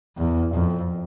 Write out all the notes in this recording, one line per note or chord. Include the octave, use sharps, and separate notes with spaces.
E2
F2